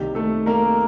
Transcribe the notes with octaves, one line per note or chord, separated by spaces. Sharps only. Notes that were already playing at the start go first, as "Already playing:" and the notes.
Already playing: C2 C3 D#3 A#3 G4
A3 A4
A#3 A#4